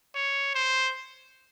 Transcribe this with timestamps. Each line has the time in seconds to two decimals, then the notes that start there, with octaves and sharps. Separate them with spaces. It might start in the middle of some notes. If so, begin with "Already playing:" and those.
0.15 C#5
0.55 C5